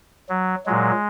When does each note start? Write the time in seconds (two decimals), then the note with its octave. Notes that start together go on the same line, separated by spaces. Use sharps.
0.29 F#3
0.66 A#2 F#3 G#3